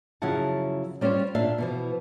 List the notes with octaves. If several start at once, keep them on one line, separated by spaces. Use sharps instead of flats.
F#2 C#3 F3 E4 F#5 A5
G3 C#4 F4 G4 C5 C#5
A#2 D4 E5 F5
B2 E3 F3